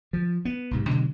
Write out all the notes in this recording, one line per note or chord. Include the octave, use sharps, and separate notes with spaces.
F3
B3
B1 G#2 C3
B2 D3 F#3 G#3